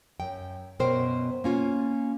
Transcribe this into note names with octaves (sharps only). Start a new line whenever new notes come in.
F#2 G5
F#2 B2 A#4 C5 G5
A#3 C#4 F4